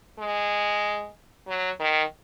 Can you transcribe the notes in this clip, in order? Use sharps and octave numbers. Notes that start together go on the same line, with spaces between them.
G#3
F#3
D#3